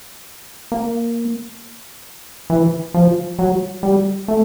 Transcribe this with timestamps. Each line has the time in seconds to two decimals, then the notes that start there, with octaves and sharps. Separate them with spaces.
0.72 A#3
2.50 E3
2.94 F3
3.39 F#3
3.83 G3
4.28 A3